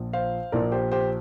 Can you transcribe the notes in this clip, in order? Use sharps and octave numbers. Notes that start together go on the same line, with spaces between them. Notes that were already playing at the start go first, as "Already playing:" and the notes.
Already playing: A#1 A#2 F3
C5 F5
A#1 A#2 F3 A#4 D5
G4 C5
G4 C5